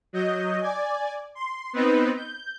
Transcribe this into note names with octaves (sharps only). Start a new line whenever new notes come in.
F#3 D#5 G6
D5 G#5
C6
B3 C4 D#4 B4
G6